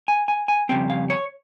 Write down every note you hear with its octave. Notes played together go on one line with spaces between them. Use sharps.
G#5
G#5
G#5
F2 C#3 G3 C4 G5
F5
C#5